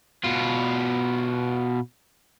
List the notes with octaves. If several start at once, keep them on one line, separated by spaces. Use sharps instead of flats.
B2 F4